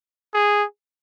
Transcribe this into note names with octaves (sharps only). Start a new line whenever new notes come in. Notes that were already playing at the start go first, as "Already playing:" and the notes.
G#4